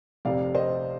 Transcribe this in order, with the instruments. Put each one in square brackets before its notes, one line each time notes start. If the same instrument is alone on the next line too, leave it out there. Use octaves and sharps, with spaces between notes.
[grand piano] F1 F2 C3 D5 F5
C5 D#5